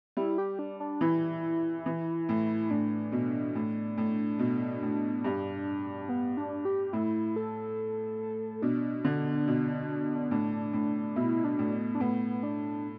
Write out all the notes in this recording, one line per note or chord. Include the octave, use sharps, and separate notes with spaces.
G3 E4
G4
D4
D4
E3 E4
E3
A2
A2 D4
B2
A2
A2
B2
A2
G2
B3
D4
G4
A2 E4
A4
B2 D4
D3
B2
A2 D4
A2
B2 E4
D4
A2
D4
A2 B3
D4